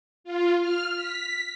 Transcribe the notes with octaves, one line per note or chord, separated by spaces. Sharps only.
F4
F6
B6